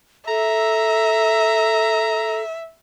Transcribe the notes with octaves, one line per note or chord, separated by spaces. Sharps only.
A4 E5 A#5